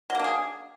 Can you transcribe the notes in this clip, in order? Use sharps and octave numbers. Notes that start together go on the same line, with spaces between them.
F#3 A#3 D4 G#4